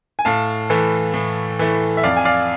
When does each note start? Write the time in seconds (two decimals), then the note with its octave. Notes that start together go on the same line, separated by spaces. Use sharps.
0.19 G#5
0.25 A2 F5 A5
0.70 E3 A3
1.14 A2
1.59 E3 A3
1.97 E5
2.03 F2 D5 F5
2.17 G#5
2.25 D5 F5